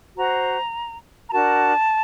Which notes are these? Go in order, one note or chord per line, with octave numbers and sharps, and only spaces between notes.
F#4 C5 A#5
A#5
D4 F#4 A#4 A5